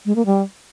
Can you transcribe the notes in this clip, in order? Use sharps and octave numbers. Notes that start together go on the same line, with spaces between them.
G#3
A#3
G3